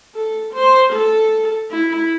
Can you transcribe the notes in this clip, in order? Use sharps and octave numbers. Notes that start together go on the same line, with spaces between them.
A4
C5
A4
E4